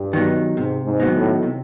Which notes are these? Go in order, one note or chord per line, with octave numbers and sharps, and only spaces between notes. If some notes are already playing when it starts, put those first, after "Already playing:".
Already playing: G2
D#3 F#3 B3 D#4
G#2 C3
G#2
D#3 F#3 B3 D#4
A2
C3